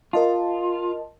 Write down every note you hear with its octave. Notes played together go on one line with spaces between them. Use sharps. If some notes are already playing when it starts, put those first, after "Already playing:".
F4 A#4 D#5 A5